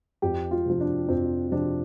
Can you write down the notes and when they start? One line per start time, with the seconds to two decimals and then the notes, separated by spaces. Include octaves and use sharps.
0.22 F2 G4
0.51 F4
0.66 C3 F3
0.80 D4
1.08 F2 C4
1.52 C3 F3 D4